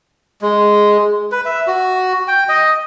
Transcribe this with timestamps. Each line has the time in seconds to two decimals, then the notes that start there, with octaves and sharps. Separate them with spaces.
0.42 G#3
1.32 B4
1.46 E5
1.67 F#4
2.28 G5
2.49 D#5